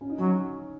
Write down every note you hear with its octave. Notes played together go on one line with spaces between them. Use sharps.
C#4
D#4
F#3 C#4